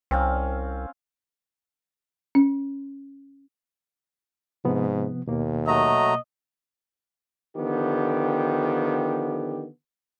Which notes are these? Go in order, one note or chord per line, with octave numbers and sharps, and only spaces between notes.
C2 C4 C#4 F5
C#4
G#2 C3 F3 B3
D#2 B2 A#3
F#3 A3 D#5 A#5
D3 D#3 F3 B3 G4